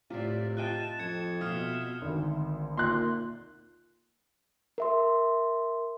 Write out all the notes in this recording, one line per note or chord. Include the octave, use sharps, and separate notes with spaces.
A2 C3 F4 D5 E5
F4 D#5 G5 A5 F#6
F2 G#6 C#7
B2 F4 E5 D#6 F6
G#1 D2
A#2 C6 F#6
A#4 E5 C6